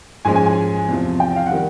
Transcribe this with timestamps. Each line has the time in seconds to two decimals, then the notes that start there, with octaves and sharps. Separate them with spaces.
0.25 G#2 F3 G#3 C#4 G#5
0.35 G#5
0.46 G#5
0.88 E2 C3 F3
1.20 G5
1.36 F5
1.46 F#5
1.52 D#3 G3